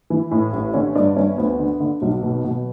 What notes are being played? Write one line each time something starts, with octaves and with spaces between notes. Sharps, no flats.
E3
A2
A1
D3 C#4
G2 D4
G1 C#4
D2 B3
D3
D3
B1 F#3
B2
B2